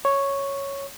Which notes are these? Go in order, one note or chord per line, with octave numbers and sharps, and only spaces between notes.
C#5